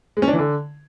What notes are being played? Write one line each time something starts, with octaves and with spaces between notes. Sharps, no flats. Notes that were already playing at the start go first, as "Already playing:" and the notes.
G#3
C#4
D4
E3
D3